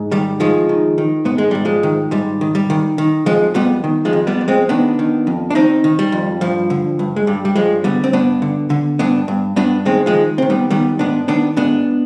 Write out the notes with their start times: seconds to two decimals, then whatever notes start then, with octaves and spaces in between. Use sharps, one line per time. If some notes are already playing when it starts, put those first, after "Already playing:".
Already playing: G#2
0.11 D#3 G3
0.40 D#3 F3 G#3
0.69 D#3
0.98 D#3
1.25 G#2 B3
1.38 G#3
1.51 G#2 G3
1.65 F3 G#3
1.83 D#3
2.11 G#2 G3
2.41 D#3
2.55 G3
2.70 D#3
2.98 D#3
3.26 F2 F3 G#3
3.54 F2 G3 B3
3.84 D#3
4.05 F3 G#3
4.13 F2
4.27 G3 B3
4.41 F2
4.48 G#3 C4
4.69 D#3 B3 D4
4.99 D#3
5.27 F2
5.50 D4
5.55 D#3 C4 D#4
5.84 D#3
5.99 G3
6.12 F2
6.41 G2 F3
6.70 D3
6.99 G2
7.16 G#3
7.27 G2 G3
7.45 G3
7.56 G2 F3 G#3
7.84 D3 G3 B3
8.04 C4
8.13 G2 B3 D4
8.42 D3
8.70 D3
8.99 G2 B3 D4
9.28 G2
9.56 G2 B3 D4
9.85 D#3 G#3 C4
10.06 F3 G#3
10.14 D#3
10.38 D#3 C4
10.50 G3 B3
10.70 D#3 G3 B3
10.99 G#2 B3 D4
11.28 D#3 B3 D4
11.57 G#2 B3 D4